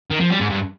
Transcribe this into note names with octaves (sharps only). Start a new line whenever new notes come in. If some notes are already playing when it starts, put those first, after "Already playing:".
D#3
F3
G3
G#2
G2